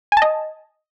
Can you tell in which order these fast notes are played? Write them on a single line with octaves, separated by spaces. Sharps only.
G#5 A5 D#5